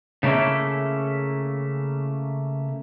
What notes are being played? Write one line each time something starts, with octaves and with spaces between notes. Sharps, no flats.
C#3 A3 A#3 C#4 E4